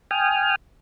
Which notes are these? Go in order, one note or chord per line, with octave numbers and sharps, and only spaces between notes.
G5 G#5 D#6 F6